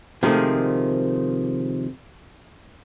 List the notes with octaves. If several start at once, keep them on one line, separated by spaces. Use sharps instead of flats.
C3 D#3 F3 G#3 A3